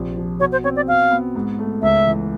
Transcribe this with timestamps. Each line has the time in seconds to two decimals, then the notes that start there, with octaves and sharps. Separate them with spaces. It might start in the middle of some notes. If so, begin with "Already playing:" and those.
Already playing: A#1 C3
0.17 F3
0.40 B2 C#5
0.52 C5
0.64 C4 C#5
0.76 D5
0.88 B2 F5
1.11 B3
1.35 G#2
1.59 A3
1.82 C#2 E5
2.07 E3